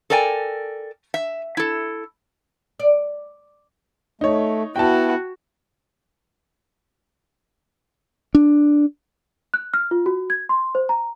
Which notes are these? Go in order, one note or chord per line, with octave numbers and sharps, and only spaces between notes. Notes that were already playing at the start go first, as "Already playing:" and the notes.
A4 A#4 D5 G5 G#5
E5
E4 A4
D5
A3 D#4 C#5
B3 E4 F#4 G5 A5
D4
F#6
F6
F4
F#4
G#6
C6
C5
A#5